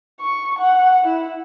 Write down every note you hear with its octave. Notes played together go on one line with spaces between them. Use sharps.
C#6
F#5
E4